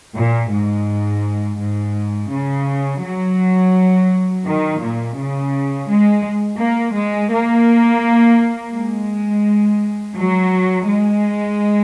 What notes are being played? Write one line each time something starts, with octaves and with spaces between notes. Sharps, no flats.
A#2
G#2
G#2
C#3
F#3
D#3
A#2
C#3
G#3
A#3
G#3
A#3
G#3
F#3
G#3